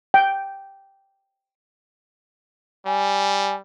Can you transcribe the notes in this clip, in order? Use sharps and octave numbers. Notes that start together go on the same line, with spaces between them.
G5
G3 G#5